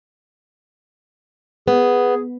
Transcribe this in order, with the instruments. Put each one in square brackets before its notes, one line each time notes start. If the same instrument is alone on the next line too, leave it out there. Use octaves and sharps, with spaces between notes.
[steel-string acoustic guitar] B3 [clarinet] G#4